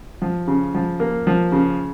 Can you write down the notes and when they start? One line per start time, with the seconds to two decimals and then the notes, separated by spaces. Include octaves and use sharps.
0.22 F3
0.48 C#3
0.75 F3
1.00 A#3
1.27 F3
1.52 C#3